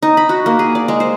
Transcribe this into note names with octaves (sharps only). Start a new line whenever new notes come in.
D#4
B5
F#4
A#3
G#4
D5
G#3
C5